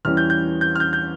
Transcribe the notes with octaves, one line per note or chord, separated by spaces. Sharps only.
E2 E3 G3 C#4 E4 F6
G6
G6
G6
F6
G6
G6